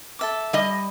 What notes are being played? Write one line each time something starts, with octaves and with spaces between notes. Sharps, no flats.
A4 E5 D6
G3 D#5